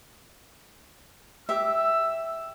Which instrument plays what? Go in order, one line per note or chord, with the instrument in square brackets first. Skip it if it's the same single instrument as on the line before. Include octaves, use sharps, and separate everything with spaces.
[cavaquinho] G4 E5 [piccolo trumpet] E6